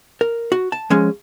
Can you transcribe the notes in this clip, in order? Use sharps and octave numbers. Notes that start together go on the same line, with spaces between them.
A#4
F#4
A5
F3 G#3 C#4